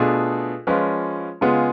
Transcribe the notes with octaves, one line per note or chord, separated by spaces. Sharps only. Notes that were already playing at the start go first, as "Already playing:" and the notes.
Already playing: B2 A3 D4 F4 G#4
F3 G#3 C#4 F4 B4
C#3 G#3 B3 F4 G#4